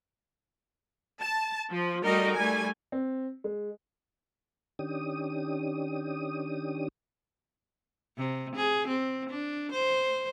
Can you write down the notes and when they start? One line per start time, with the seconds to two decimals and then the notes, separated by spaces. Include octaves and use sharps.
1.21 A5
1.71 F3
2.05 G3 A3 D#4 F#4 A#4 D#5
2.36 G3 A3 G#5
2.92 C4
3.44 G#3
4.79 D#3 C#4 D4 G4 D#6
8.18 C3
8.56 G#4
8.88 C4
9.30 D4
9.72 C5